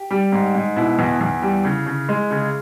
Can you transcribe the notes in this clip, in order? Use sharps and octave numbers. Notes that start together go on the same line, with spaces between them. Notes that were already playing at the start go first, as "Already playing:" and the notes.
Already playing: G4
G3
G#2
G#2
B2 E4
E2
E2
G3
C#3
C#3
G#3
C#3